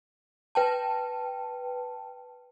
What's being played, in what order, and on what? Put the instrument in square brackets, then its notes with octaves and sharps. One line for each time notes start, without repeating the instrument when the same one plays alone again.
[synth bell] B4 G5 A5